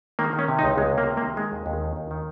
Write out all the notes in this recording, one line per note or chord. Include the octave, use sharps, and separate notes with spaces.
D#3 A#3
D#3
C#4
C3
D#4
C#2
C#2 G#3
C3
A#3
C3
A#3
D#3
D#3 G#3
D#2
D#2
D#3
D#2
D#3